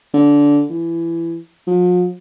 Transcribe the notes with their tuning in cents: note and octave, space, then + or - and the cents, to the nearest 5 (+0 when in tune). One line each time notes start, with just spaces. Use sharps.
D3 -20
E3 +20
F3 +45